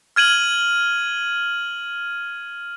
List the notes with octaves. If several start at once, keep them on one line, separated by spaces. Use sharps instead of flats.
F6 G#6 D#7 F#7